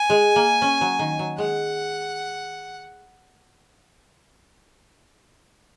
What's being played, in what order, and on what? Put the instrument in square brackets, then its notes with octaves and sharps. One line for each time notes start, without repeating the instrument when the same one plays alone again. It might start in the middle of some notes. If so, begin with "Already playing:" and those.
Already playing: [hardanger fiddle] G#5
[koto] G#3
A#3
C#4
F#3
D#3
F#3
[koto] G#3 [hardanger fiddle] F#5